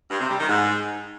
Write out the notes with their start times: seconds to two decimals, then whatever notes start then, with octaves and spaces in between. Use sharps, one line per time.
0.10 G2
0.20 C3
0.30 G3
0.39 D#3
0.49 G#2